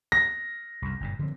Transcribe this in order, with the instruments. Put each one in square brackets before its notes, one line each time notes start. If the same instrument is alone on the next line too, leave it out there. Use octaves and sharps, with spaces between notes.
[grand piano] A#6
[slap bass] C2 F#2
F#1 G2 A#2
D3 F3 C4